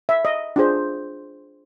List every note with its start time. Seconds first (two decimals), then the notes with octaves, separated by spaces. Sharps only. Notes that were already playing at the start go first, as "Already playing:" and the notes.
0.09 E5
0.25 D#5
0.56 D4 F4 G#4 C5